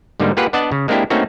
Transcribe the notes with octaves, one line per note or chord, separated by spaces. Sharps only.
G#2 D3 G3 A#3 D#4
A#3 F4 G4 G#4 B4 F#5
B3 D4 D5 D#5 F#5 A5
C#3
G#3 A#3 C4 D4 E4 G4
A3 A#3 C4 C#4 D#4 F#4